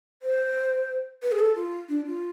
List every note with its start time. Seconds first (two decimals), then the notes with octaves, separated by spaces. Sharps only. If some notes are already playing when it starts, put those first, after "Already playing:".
0.22 C5
1.23 B4
1.32 G#4
1.39 A4
1.55 F4
1.89 D4
2.06 F4